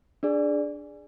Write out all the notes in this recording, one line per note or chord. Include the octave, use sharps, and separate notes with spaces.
D4 G#4 D5